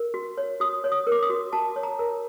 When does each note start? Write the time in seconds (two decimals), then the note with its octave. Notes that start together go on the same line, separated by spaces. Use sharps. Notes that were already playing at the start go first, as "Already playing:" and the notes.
Already playing: A#4
0.14 F#4
0.38 C#5
0.60 F#4 D#6
0.84 C#5
0.92 D#6
1.07 A#4
1.12 D6
1.23 D#6
1.30 F#4
1.53 F#4 A5
1.76 C#5
1.83 A#5
1.99 A#4